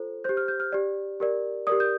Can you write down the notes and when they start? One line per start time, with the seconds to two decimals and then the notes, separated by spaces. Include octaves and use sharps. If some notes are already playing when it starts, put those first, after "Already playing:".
Already playing: F4 A4 C5
0.24 G4 C5 G6
0.37 F6
0.48 G6
0.60 F6
0.72 G4 D5
1.20 G4 A#4 D5
1.67 G4 A#4 D5 D#6
1.80 G6